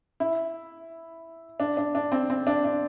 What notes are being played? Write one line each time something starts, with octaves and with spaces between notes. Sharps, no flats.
E4
D4
D4
D4
C4
C4
D4
D4